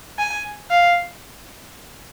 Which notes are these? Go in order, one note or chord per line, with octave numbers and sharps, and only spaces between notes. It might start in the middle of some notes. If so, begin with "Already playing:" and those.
G#5
F5